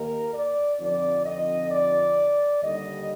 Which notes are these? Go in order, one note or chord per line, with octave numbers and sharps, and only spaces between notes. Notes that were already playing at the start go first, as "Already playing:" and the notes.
Already playing: D#2 D#3 A#3 D#4 A#4
D5
F2 D3 F3 C4 D#4 D5
D#5
D5
D#2 D3 G3 D#5